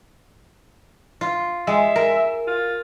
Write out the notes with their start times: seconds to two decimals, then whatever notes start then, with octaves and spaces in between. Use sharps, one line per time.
1.21 F4
1.67 G#3 E5
1.96 A#4
2.47 F4